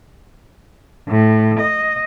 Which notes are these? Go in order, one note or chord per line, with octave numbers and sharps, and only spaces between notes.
A2
D#5